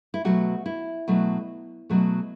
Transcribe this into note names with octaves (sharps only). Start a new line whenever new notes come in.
E4
B2 F#3 A3 F#4
E4
B2 F#3 A3
B2 F#3 A3